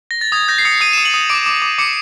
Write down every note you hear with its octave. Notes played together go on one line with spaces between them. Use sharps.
A#6
A6
D#6 G#6
G6 A#6
C7
D#6 C#7
D#6 D#7
E7
D#6
F#7
D#6
D6 D7
D6
D6
D6 C#7